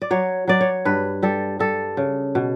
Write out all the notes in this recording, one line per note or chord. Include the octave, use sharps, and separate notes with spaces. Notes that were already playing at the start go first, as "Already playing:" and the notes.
D5
F#3 C#5
F#3 D5
C#5
G2 B4
G3 A4
G3 A4
C#3
B2